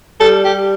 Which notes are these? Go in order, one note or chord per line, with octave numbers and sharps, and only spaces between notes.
G3 A4
G4